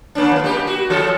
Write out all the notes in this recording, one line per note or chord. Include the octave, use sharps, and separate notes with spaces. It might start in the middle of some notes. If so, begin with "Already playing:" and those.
A#3 C#4 D4
E3 A#3
G#3 A#3 G4
F#4
E3 G#3 A4